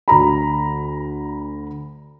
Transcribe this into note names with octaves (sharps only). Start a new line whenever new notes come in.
D2 A#5 B5